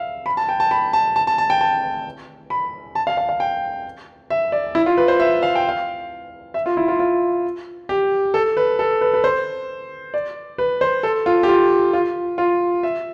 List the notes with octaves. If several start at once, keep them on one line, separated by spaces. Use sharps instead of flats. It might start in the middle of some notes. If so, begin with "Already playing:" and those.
Already playing: E5 F5
B5
A5
G5
A5
B5
A5
A5
A5
A5
G5
A5
B5
A5
F5
F5
F5
G5
E5
D5
E4
F4
B4
C5
E5
F5
G5
F5
E5
F4
E4
F4
F4
G4
A4
B4
A4
B4
B4
C5
D5
B4
C5
A4
F4
G4
F4
F4
F4
E5